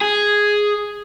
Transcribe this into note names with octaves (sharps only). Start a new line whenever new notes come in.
G#4